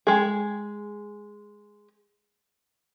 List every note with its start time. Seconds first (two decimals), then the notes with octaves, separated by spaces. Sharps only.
0.07 G#3 G#4